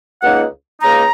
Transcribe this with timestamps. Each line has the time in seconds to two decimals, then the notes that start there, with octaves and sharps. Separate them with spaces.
0.22 C#2 C#3 A#3 D#4 F#5
0.81 C#2 C#3 A#3 D#4 A#5